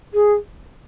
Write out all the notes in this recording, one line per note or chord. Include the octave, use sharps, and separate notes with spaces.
G#4